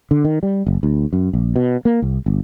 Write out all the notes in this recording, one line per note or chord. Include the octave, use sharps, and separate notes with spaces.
D3
D#3
G3
F#1
D2
F#2
A#1
B2
A#3
C2
G1